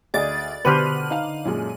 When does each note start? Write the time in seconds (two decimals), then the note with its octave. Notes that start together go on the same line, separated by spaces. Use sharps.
0.14 D2 G#4 D5 D#5 A6
0.65 B2 D3 G4 B4 C5 F6 D#7 F#7
1.10 D#4 F5
1.45 F#2 A#2 G#3